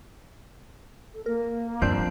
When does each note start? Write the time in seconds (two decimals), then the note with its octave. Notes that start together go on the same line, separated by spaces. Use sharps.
1.13 A4
1.26 A#3 A#4
1.82 E2 G2 F3 C4 D4 G6